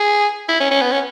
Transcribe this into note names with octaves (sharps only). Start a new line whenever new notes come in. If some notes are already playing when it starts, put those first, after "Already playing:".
Already playing: G#4
E4
C#4
C#4
B3
C#4